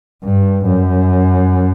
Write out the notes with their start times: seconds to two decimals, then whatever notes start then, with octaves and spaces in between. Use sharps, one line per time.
0.24 G2
0.65 F#2